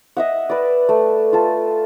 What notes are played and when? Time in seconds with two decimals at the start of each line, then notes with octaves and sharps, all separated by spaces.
0.17 D#5 E5 F#5
0.50 B4 D5
0.89 A3
1.33 F4 A4